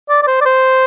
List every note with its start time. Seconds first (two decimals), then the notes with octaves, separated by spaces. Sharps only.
0.09 D5
0.23 D5
0.27 C5
0.41 D5
0.46 C5